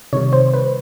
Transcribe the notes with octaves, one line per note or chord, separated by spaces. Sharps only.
C3 D#3 G3 C#5
C5
B4